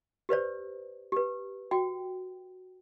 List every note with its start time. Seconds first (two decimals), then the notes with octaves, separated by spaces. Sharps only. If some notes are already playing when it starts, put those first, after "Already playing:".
0.29 G4 B4 C5 D5
1.12 G4 B4
1.71 F#4 G5